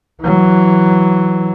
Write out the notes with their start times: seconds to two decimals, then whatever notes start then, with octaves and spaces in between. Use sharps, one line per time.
0.21 E3 F#3